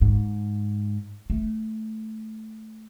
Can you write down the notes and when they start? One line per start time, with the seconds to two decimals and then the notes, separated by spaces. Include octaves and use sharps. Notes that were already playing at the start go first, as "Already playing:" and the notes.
0.01 G#2
1.30 A3